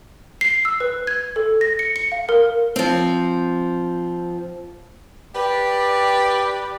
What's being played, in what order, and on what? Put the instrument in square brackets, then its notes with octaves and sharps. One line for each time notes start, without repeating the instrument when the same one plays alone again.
[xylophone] C7
E6
B4
G#6
A4
A#6
C#7
C#7
F5
A#4
[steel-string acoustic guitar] F3 C4
[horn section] G4 B4 D5